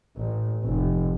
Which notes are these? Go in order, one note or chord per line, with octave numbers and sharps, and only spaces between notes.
A1
F1